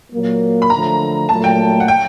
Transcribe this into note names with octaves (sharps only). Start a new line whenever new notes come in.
A#2 F#3 A#3
B5
D3 F3 A3 A#5
A#2 F#3 A3 A5
G5
F#5
G5